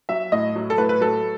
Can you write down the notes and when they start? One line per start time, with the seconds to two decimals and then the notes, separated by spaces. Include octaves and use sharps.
0.09 F#3 E5
0.32 A2 D#5
0.56 F#3
0.70 A4
0.78 A2 B4
0.89 B4
1.01 F#3 A4